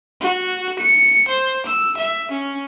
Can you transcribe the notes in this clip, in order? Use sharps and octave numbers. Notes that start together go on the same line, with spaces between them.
F#4
C#7
C5
E6
E5
C#4